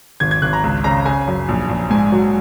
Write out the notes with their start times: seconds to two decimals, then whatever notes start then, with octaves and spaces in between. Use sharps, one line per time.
0.20 G#1 G#6
0.31 G#6
0.42 G#1 F#6
0.53 A#5
0.63 C#2
0.84 C#3 A#5
1.06 C#3 G#5
1.27 F#2
1.48 A#1
1.69 A#1
1.90 G#2 G#5
2.12 F#3